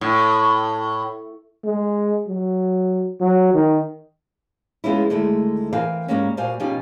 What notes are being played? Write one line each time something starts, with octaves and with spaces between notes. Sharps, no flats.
A2
G#3
F#3
F#3
D#3
F3 G#3 B3 C#4 D#4 E4
D2 D#3 G#3 A3 E4
E3 C4 A#4 E5 F5 G#5
G#2 D3 G3 G#3 A#3 C#4
A#2 G3 F#4 C5 F5 G#5
B2 F3 C#4 D#4 G4 G#5